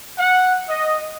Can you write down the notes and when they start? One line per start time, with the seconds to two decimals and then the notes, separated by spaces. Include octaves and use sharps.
0.19 F#5
0.68 D#5